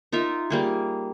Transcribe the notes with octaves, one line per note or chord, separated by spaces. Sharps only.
D#4 F4 A#4 E5
G3 A#3 G#4